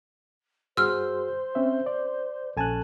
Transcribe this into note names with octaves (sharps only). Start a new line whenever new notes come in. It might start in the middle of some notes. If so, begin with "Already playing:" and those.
G2 F#4 G#4 C5 C6 E6 F6
C4 C#4 E5
D5
A#1 C#4 A4 G#5 A5 F#6